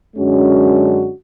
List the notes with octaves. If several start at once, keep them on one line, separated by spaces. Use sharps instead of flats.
F#2 D3 G#3 C#4 F#4